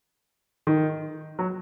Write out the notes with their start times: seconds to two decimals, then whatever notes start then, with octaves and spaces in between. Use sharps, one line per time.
0.67 D#3
1.39 F#3